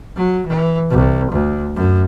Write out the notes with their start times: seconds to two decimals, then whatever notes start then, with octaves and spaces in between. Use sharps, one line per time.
0.16 F#3
0.47 E3
0.91 C2
1.32 D2
1.76 F#2